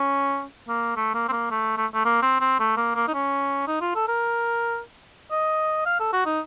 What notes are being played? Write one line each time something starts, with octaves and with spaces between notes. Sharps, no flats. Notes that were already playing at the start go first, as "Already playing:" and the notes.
Already playing: C#4
A#3
A3
A#3
C4
A#3
A3
A3
A3
A#3
C4
C4
A3
A#3
A#3
D#4
C#4
D#4
F4
A4
A#4
D#5
F5
A4
F#4
D#4